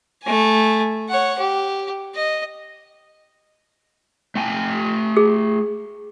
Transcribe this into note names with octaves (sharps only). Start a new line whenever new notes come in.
A3 G#5
C#5 F#5
G4
D#5
A3 G5 G#5
G#4